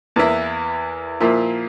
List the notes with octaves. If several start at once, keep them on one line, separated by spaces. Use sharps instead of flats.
E2 E3 A#3 E4 A#4
A#2 F3 A#3 E4